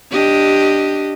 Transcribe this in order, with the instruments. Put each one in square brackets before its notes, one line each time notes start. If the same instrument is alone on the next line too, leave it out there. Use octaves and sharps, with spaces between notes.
[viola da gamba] D4 G4 D#5